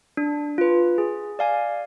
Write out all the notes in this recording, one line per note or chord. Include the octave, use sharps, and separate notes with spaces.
D4
F4 B4
G#4
D5 F5 G#5